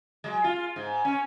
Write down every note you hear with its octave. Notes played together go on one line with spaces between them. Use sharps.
F#3 G#3
F4
G#2
C#4